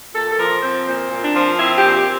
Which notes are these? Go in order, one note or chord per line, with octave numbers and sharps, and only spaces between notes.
A#2 A4
A4
F3 A#4
C4 C5
A#2 C5
A#2
D4
F3
C4 E4
G4
A#2
G4